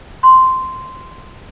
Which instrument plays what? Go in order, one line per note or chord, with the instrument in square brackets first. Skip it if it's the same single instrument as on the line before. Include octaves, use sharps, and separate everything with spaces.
[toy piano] C6